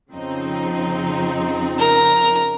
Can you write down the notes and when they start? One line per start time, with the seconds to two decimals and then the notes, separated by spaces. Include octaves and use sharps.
0.11 F2 C#3 F3 C4 D#4
1.79 A#4